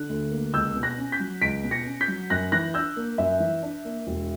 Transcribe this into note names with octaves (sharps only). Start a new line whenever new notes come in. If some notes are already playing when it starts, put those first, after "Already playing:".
Already playing: D3 F#6
D2
A#3
C#2 E6 G6
B2
F#6 A#6
C#4
G6 B6
F#3
C#2 B6 D7
B2
A#6 C#7
C#4
G6 B6
F#3
F#2 F#6 A#6
E3 F#6 A#6
D4 E6 G6
A#3
F#2 E5
E3
D4
A#3
E1